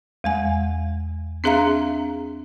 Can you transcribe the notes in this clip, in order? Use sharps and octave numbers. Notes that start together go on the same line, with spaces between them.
E2 G#3 G#5
C4 D4 G#4 E5 F5 A#5